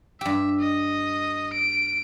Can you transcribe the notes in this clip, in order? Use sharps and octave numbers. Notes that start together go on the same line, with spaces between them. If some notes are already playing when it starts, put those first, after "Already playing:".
G2 G4 E5
D#5
D7